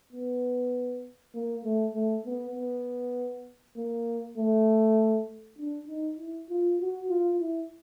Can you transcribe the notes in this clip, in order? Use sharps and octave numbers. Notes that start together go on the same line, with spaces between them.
B3
A#3
A3
A3
B3
B3
A#3
A3
D4
D#4
E4
F4
F#4
F4
E4